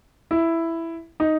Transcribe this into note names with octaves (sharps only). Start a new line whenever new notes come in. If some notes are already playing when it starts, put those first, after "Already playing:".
E4
D#4